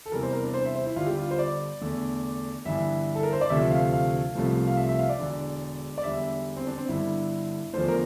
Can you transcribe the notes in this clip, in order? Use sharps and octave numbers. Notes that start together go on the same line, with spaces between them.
A4
E2 C3 E3 G3 A#4
C5
A#4
D4
C5
E5
C5
E4
G1 G2 D3 G3 F4
G4
F4
C5
D5
E2 D3 A3
G1 G2 E3 E5
A4
A#4
C5
D5
D2 C3 F3 A3 E5
F5
F5
C2 C3 F3 A3
F5
E5
E5
F5
D5
E1 E2 D3
D5
E2 D3 G3 E5
C4
D4
C4
G1 G2 D3 E4
E2 D3 F3 A3 C5
A#4